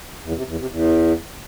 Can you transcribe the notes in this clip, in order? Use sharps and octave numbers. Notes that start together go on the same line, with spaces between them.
E2
C3
E2
C3
E2